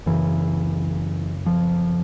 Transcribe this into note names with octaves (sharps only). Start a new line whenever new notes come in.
F#2 C#3 E3
F3